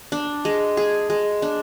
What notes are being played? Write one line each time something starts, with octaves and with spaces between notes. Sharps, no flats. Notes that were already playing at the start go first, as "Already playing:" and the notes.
D4
G#3
G#4
G#3
D4